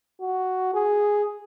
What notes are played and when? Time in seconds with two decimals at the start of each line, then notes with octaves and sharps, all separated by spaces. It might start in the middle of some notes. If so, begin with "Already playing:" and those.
0.21 F#4
0.74 G#4